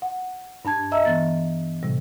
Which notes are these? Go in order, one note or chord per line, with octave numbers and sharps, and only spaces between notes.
F#5
G2 D4 A5 G#6
D#5 E5 A#5 E6
E3 B3 A6
A2 C3 G3